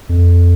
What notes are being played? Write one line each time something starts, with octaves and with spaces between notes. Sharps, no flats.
F2